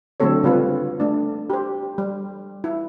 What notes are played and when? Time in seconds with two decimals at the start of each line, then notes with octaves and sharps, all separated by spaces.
0.20 D3 F#3 A3 C4 A4 C#5
0.43 C#3 G3 C4 F4 B4
1.00 A3 D4
1.50 G4 C5
1.98 G3
2.64 E4